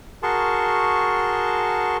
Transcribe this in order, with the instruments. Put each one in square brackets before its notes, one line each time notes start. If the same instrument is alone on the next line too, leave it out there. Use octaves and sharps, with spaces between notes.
[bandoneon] F#4 G#4 A#4 A5 C6 C#6